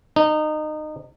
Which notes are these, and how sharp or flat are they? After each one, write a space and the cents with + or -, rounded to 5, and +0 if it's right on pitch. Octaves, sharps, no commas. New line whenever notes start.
D#4 -25